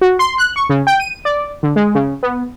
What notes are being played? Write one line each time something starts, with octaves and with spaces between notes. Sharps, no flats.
F#4
C6
F#6
C#6
C#3
G5
D#7
D5
D3
G#3
C#3
B3